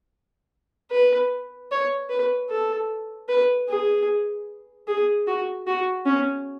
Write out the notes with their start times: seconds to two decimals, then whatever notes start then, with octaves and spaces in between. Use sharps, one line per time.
0.91 B4
1.71 C#5
2.10 B4
2.50 A4
3.28 B4
3.69 G#4
4.88 G#4
5.27 F#4
5.67 F#4
6.06 C#4